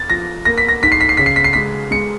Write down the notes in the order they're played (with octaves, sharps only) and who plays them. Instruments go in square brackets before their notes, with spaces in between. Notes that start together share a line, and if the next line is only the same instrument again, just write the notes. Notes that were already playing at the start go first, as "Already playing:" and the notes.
Already playing: [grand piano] A6
[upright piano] F3 [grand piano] A#6
[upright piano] A#3 [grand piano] A#6
[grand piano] B6
A#6
[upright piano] G#2 [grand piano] B6
[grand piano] C7
B6
C7
[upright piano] C#3 [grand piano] B6
[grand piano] C7
B6
C7
[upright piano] G#3 [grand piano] B6
[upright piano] G#3 [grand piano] C#7